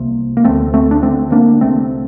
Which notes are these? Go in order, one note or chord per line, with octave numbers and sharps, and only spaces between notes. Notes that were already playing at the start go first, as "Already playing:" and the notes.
Already playing: C2 C3 A#3
A#3
D2 D3 A3 C4
A3 C4
D4
D2 D3 A3 C4
A#3 D4
C2 C3 A3 C4